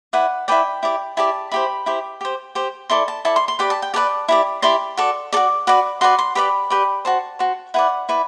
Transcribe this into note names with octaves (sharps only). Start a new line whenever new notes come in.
E4 B4 D5 F#5
E4 B4 D5 G5
E4 G4 D5
E4 G4 D5 A5
E4 G4 C5 B5
E4 G4 C5
G4 C5
G4 C5
E4 A4 D5 C6
A5
E4 A4 D5 A5
C6
C6
G4 B4 D5 B5
A5
G5
G4 B4 D5 A5
E4 G4 D5
E4 G4 D5 C6
F#4 A4 D5
F#4 A4 D5 D6
F#4 B4 D5
F#4 B4 D5 C6
C6
G4 B4 D5 B5
G4 B4 D5
F#4 C5 A5
F#4 C5
E4 B4 D5 F#5
E4 B4 D5